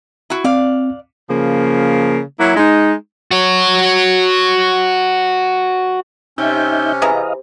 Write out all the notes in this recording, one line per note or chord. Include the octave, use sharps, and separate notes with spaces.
E4 F#4
C4 D5 F5
C#3 F3 A#3
F#3 A#3 E4
G#3 D#4
F#4 C#5
C3 C#4 D#4 E5 G6
E3 G#4 D#5 F5 A#5